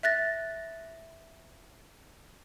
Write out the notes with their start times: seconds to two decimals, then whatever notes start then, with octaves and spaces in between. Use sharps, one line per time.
0.03 E5 F#6 A6 A#6